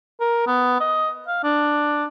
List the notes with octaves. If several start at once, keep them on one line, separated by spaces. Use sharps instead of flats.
A#4
B3
D#5
F5
D4